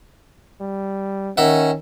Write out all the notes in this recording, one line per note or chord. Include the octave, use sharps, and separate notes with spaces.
G3
D#3 C#4 E5 F#5